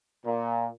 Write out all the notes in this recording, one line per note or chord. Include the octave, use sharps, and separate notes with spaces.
A#2